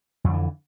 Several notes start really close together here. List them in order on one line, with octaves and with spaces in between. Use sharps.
F2 D3 E3